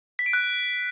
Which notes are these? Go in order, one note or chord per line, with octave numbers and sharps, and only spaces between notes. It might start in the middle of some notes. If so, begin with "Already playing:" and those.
B6
D7
F#6